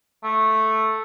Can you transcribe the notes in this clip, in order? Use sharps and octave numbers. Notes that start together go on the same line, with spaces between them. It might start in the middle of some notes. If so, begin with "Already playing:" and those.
A3